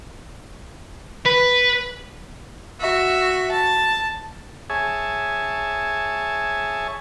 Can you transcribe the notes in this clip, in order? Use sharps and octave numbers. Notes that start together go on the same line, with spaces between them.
B4
F#4 E5
A5
G#4 C#5 E5 G#5 A5